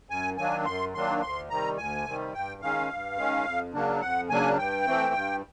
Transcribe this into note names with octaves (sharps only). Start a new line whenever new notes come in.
F#2 G#5
D#3 F#3 A#3 D4 G#5
F#2 C6
D#3 F#3 A#3 D4 C6
D2 C6
C3 D#3 G3 A#5
D2 G#5
C3 D#3 G3
G2 G5
D#3 G#3 C#4 F5
G2
D#3 G#3 C#4
F2
C#3 F#3 A#3 D4
F2 F#5
C#3 F#3 A#3 D4 G#5
G2 G5
E3 A3 C4
G2